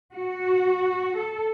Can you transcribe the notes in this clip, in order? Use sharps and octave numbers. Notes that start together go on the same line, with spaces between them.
F#4
A4